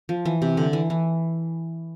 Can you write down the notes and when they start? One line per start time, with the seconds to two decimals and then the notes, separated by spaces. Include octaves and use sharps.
0.09 F3
0.25 E3
0.42 C3
0.57 D3
0.73 E3
0.90 E3